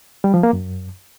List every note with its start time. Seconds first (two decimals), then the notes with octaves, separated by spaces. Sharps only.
0.24 G3
0.34 F3
0.43 A#3
0.53 F#2